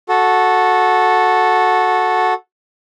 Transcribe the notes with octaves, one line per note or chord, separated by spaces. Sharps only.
F#4 A4